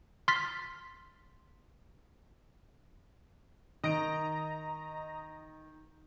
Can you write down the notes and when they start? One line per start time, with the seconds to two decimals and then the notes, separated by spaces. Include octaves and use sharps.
0.28 C6 F6 A6 B6
3.84 D#3 D#5 A#5 D7